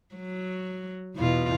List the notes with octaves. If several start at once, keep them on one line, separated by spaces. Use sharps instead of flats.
F#3
E2 B2 F4